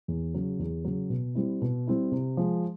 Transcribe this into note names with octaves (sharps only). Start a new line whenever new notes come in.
E2
C#3 F#3
E2
C#3 F#3
B2
G3 C4 E4
B2
G3 C4 E4
C3
F3 G#3